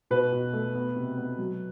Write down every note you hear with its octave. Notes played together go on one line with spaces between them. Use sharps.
B2 B4
B2
A3
B3
C3
B3
F#3